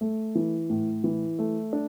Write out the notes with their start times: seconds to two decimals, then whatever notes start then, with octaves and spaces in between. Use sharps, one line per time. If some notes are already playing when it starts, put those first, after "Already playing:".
0.01 A3
0.35 E3
0.70 A2
1.04 E3
1.39 A3
1.73 D4